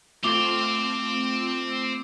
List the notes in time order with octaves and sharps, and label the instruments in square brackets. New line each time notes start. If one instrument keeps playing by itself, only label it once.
[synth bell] A3 F4 [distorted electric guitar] C4 G5 [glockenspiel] D6 F7 G7